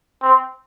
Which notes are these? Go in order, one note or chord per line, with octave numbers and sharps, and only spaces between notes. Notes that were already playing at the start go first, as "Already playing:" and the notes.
C4